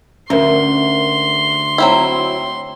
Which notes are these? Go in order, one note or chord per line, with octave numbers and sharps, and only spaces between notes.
D2 C#4 A#4 C6
F#3 C4 E4